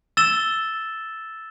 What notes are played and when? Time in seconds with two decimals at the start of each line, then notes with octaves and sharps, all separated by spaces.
0.17 E6 A6 E7 G7